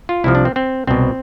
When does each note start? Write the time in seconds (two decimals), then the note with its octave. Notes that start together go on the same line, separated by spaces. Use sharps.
0.09 F4
0.24 C2 C3 F3 E4
0.35 D4
0.45 C4
0.56 C4
0.87 C2 B2 C4